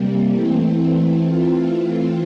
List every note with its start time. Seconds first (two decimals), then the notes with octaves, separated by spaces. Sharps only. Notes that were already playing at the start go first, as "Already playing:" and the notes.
Already playing: C3 G3 A#3
0.30 E3 A3 C4
1.23 E3 A3 C4 F4